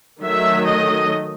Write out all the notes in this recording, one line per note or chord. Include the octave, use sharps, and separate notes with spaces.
D#3 F#3 A3 E5
D#5